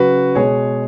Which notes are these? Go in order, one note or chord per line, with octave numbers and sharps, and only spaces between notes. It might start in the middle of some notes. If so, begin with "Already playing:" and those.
Already playing: C#3 F#3 F#4 B4
B2 G#3 G#4 C#5